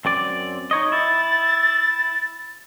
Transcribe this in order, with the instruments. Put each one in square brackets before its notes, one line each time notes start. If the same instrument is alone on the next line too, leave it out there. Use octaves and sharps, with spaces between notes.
[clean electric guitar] F#2 C4 D5
D#4 C#5 D#5
[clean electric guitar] E4 [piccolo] A6